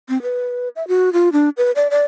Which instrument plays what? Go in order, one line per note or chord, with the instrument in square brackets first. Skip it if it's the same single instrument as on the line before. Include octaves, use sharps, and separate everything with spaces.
[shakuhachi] C4
B4
E5
F#4
F4
D4
B4
D5
D5